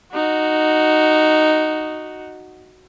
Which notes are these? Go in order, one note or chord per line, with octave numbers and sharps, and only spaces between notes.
D#4 F#4